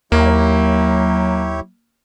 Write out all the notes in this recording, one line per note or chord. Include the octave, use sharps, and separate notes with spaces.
D#2 F#3 A#3 E4 G4 C#5